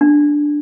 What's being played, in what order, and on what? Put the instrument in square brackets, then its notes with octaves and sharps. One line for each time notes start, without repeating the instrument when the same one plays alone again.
[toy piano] D4